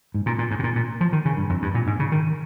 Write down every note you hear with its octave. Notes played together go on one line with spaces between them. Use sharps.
G#2
A#2
A#2
G#2
C3
A#2
A#2
F3
D#3
C#3
G2
F2
G2
A#2
G#2
C#3
D#3